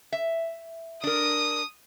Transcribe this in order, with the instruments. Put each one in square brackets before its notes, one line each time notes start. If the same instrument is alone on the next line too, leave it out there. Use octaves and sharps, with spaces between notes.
[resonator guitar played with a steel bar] E5
[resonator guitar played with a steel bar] D4 A#4 [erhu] D#6